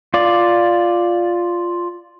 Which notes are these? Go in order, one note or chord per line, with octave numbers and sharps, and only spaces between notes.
F4 D5